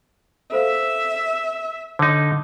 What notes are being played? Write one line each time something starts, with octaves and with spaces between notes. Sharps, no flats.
A4 C5 E5 F5
D3 D#4 C#5